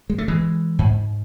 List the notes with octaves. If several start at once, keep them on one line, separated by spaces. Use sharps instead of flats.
G#3
A3
E3 G#3
G#2